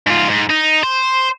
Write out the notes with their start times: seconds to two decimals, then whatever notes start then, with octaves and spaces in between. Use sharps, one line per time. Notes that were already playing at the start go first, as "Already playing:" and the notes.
0.07 G#2 F4
0.29 G#2
0.50 D#4
0.83 C5